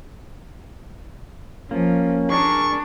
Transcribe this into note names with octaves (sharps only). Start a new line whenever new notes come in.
F3 A#3 C#4
D4 G#4 A#4 C#6